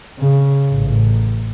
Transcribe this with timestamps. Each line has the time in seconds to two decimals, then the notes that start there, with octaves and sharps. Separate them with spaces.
0.19 C#3
0.72 A1